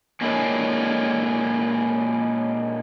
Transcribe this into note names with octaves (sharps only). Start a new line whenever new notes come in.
A#2 G#3 A#3 C#4 D4 E4